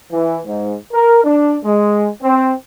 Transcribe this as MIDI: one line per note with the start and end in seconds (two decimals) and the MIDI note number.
0.12 0.40 52
0.46 0.74 44
0.93 1.23 70
1.24 1.56 62
1.64 2.08 56
2.22 2.53 60